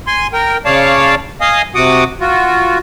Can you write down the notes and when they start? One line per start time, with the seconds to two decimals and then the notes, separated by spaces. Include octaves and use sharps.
0.07 G#5 C6
0.33 A#4 G5
0.65 C#3 C#5 D5 F5 A5
1.41 D#5 F5 G#5 D#6
1.75 C3 F#4 F#5 D6 D#6
2.21 F4 F#4